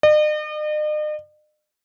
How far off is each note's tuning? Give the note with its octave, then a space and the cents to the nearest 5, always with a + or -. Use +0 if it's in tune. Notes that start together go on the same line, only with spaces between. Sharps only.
D#5 -45